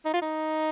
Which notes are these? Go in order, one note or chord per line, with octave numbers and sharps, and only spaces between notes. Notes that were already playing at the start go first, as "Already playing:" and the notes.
D#4
F4
D#4